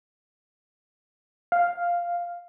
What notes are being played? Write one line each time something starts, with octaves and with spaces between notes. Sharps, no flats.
F5